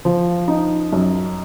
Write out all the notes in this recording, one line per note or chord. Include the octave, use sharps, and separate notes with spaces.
F3
D#4
F#2